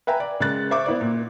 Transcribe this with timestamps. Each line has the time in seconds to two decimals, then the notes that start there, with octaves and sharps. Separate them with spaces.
0.07 B4 E5 G5 G#5 A#5
0.20 D5
0.40 C#3 G#3 A#4 F#6 A6
0.71 C5 E5 C#6 D6
0.86 B3 E4 C5 D5
1.01 A#2